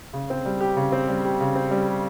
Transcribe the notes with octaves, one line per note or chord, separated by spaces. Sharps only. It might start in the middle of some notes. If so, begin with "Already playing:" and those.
C#3
C4
G3
G4
C#3
C4
G3
G4
C#3
C4
G3
G4